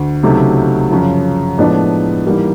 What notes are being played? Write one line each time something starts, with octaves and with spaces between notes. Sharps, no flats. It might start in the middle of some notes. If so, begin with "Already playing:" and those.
Already playing: D2
C#2 C3 D#3 F#3 A3
F#2 C#3 F3
A2 F3 G#3 B3 D4
G#2 E3 G3 A#3